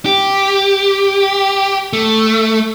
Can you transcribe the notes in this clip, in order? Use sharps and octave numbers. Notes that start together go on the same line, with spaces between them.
G4
A3